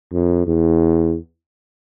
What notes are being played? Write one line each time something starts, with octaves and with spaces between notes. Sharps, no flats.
F2
E2